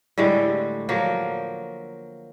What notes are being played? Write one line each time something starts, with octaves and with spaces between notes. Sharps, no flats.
A2 D3 G3 G#3
F3 F#3 A#3